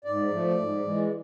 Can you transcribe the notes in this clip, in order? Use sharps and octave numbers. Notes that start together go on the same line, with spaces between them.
G#2 D5
F3 A3
G#2
E3 G#3